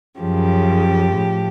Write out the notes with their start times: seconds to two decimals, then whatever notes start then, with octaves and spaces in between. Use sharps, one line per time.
0.19 F#2 C#3 F3 G4
1.16 A2 F3